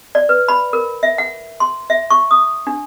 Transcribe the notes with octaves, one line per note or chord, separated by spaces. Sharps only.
D5
B4
B5
A#4
E5
F#5
C6
E5
C#6
D#6
D4